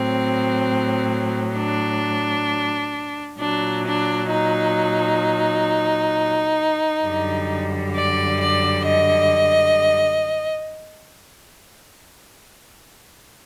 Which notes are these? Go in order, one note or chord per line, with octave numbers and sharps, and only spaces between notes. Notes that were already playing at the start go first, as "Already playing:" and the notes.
Already playing: A2 F#3 C4
D4
A#2 F#3 D4
D4
D#4
F#2 D3 G3
D5
D5
D#5